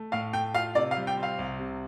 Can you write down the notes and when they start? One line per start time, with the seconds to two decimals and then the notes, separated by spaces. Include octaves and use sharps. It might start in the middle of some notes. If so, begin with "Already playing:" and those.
Already playing: A3
0.12 A2 F5
0.33 A3 G5
0.54 F4 F5
0.75 C3 D5
0.91 F5
0.96 G3
1.07 G5
1.17 C4
1.23 F5
1.39 C2
1.59 C3